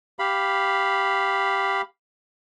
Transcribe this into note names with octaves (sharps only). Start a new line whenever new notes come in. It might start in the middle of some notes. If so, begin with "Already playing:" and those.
G4 F5 B5